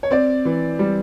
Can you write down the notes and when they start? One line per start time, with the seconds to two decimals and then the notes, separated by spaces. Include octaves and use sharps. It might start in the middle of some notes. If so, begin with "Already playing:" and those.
0.03 C#5
0.11 C4 D5
0.45 E3
0.79 G3